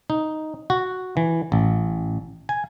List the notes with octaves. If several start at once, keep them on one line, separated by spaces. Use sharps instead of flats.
D#4
F#4
E3
A1
G#5